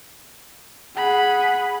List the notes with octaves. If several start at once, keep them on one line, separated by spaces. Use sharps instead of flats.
G#4 F#5 B5